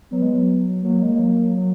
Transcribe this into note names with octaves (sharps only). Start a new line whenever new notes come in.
F#3 B3
G#3
F#3
F#3 A#3
G#3
G#3
F#3
F#3